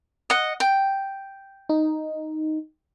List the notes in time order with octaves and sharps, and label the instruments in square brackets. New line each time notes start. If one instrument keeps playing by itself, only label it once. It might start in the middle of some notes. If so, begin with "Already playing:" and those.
[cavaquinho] D#5 F#5
G5
[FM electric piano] D#4